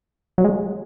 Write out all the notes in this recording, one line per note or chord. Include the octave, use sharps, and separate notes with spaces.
F#3
G#3